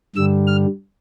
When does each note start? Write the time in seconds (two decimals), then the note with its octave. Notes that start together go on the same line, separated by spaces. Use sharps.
0.16 G2 D3 G3 E6
0.47 F6